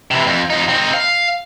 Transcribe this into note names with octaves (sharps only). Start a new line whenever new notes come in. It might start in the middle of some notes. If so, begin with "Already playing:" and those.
C3 E3
F2
F2 D#4
C4 D#4
F5